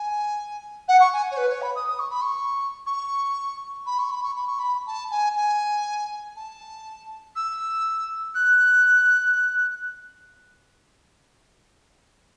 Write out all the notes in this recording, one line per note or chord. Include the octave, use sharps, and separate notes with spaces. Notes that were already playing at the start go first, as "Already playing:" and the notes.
Already playing: G#5
F#5
C#6
G#5
C#5
B4
C#5
B5
D#6
D#6
C#6
B5
C#6
C#6
B5
C#6
B5
C#6
B5
C#6
B5
A5
G#5
G#5
A5
E6
F#6